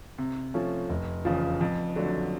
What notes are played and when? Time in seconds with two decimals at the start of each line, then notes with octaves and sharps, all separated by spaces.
0.18 C3
0.54 F3 A3 C#4
0.89 F1
1.25 E2 C#3 F3
1.61 F2
1.96 D3 F#3 A3